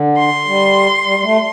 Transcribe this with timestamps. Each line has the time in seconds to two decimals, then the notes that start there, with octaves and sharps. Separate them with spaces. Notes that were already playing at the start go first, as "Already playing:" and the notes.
Already playing: D3
0.18 C6
0.47 G3
1.05 G3
1.19 G3
1.24 A3